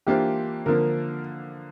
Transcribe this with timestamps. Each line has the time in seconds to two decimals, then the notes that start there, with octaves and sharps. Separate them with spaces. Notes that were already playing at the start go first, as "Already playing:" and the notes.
0.07 E3 A#3 D4 F4 G4 C5
0.66 D3 F3 A#3 A#4